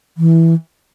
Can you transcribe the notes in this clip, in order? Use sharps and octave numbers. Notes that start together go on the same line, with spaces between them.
E3